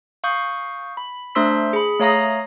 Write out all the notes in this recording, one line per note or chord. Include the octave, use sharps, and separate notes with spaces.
F5 C#6 D#6 G6
B5
A3 D4 C5 C6 E6 B6
G#4 B5
A3 C#5 F5 A#5 D#6 A#6